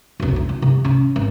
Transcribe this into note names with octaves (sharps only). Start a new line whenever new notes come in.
F1 B1
D3
E4
C3
C#4
G#1